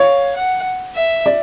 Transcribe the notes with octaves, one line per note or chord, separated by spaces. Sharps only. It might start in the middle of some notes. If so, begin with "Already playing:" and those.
Already playing: C#5 F5
F#5
E5
D5